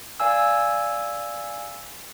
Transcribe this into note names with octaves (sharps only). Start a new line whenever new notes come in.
D5 F5 G#5 E6